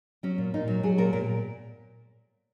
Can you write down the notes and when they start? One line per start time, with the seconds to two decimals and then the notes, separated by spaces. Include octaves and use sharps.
0.23 F#3 C#4
0.38 A#2
0.54 A#2 D#4
0.68 F#3
0.83 F#3 G#4
0.98 A#2 A#4
1.13 A#2 A#4